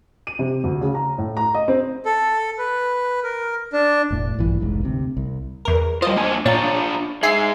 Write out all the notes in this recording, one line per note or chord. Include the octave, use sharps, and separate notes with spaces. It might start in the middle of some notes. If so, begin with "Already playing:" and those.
D#7
C3
D2
C#3
A#5
A2
A#5
D#5
C4
A4
B4
A#4
D4
E1 A2
A#1 G2 A#2 E3
F1 B1 G#2
D2 C3
C2
E2 A#4
G3 F4 C5 D#5
A#3 D4 G#5
A#2 D4 F4 C#5 A#5 A6
D#4 G#4 E5 G#5 C7